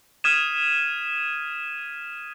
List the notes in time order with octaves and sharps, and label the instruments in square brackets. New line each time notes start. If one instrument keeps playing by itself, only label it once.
[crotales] D#6 F6 G#6 B6 D#7 E7